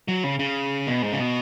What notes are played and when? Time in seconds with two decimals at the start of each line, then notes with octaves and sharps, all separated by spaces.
0.08 F#3
0.24 C#3
0.39 C#3
0.87 B2
1.02 G#2
1.13 C#3
1.19 B2